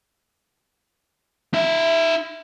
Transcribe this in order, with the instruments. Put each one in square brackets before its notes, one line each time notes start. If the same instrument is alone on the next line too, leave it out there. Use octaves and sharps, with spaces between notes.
[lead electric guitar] D#4 E5